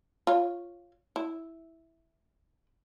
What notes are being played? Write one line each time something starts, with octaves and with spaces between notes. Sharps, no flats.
F4 C#5
E4